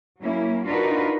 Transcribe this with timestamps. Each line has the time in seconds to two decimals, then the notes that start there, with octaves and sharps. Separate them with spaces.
0.22 F#3 A#3 C#4 E4
0.66 D4 D#4 F4 F#4 A#4 B4